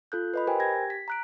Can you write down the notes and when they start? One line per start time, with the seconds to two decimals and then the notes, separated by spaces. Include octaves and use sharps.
0.12 F4 A4 F#6 G6
0.34 B4 D#5 B5
0.47 G4 A#4 C5 G5 G#5
0.60 G4 G#6 A#6
0.90 B6
1.08 A#5 F#6 D7